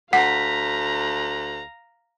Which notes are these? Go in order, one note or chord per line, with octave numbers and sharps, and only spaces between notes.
D2 F5 F#5 A#5 B6